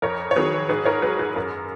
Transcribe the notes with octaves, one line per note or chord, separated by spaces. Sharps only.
F2 A#4 C#5
C#5
D#3 F#3 G#4 B4
G#2 G#4 B4
A#4 C#5
F#3 G#4 B4
G#4
F#2 A#4